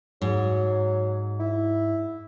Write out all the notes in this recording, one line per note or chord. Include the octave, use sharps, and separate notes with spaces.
G#2 F#3
E4